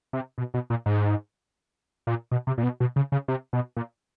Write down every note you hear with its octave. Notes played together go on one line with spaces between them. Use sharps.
C3
B2
B2
A#2
G#2
A#2
B2
C3
A#2
B2
B2
C#3
C#3
C3
B2
A#2